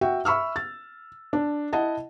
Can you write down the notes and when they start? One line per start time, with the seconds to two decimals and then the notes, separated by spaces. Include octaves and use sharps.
0.01 F#4 E5 G5
0.25 E5 B5 C#6 E6 F6
0.56 A6
1.33 D4
1.73 E4 D#5 F#5 A5